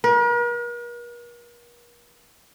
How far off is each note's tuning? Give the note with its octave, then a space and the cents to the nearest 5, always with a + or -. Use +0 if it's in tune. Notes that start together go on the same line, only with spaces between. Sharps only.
A#4 +45